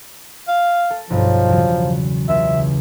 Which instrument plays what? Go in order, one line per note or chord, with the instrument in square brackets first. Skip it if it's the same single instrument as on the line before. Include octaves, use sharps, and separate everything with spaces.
[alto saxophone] F5
[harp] A4
[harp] B1 G2 [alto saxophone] F3
[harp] E2 C#3 F#3
[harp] C#2 [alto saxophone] E5